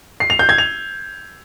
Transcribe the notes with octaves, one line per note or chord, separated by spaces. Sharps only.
C7
F7
G6
G#6
F7